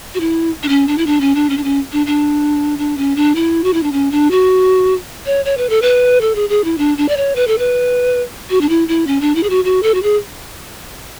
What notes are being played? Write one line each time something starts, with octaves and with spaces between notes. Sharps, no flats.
F#4
E4
D4
C#4
D4
E4
D4
C#4
D4
C#4
D4
C#4
D4
D4
D4
C#4
D4
E4
F#4
E4
D4
C#4
D4
F#4
C#5
C#5
B4
A4
B4
A4
G#4
G#4
E4
D4
D4
D5
C#5
B4
A4
B4
F#4
D4
E4
E4
C#4
D4
E4
G#4
F#4
F#4
A4
F#4
G#4